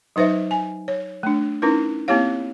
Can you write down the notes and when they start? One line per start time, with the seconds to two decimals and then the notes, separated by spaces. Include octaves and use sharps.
0.16 F#3 D#4 B4 C5 E5
0.51 G#5
0.88 C#5
1.23 A3 D4
1.62 C#4 D#4 E4 A#4 B4
2.08 A#3 C4 E4 G4 C#5 F5